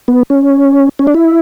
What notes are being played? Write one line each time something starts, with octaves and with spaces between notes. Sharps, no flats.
B3
C#4
C#4
D4
E4